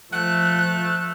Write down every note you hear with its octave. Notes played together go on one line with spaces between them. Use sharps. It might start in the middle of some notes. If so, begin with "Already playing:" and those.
F3 A3 F#6